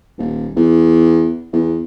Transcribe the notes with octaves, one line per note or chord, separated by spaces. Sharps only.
D#1
E2
E2